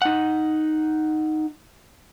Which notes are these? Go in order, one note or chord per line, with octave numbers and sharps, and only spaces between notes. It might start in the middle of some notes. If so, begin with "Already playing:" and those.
D#4 F#5